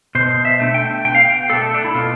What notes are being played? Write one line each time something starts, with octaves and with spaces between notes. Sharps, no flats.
B2 C5
E5
A3 D4
G5
B2 G5
F5
G5
A3 D4 A4
D4
E4
B2 F4